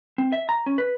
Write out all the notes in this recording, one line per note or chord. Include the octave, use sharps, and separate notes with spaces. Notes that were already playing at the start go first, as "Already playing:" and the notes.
C4
E5
A#5
C#4
B4